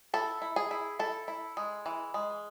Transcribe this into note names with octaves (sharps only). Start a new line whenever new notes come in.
E4 A4
E4
G#4
E4
E4 A4
E4
G#3
E3
G#3